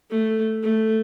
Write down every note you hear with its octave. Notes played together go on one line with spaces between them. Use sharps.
A3
A3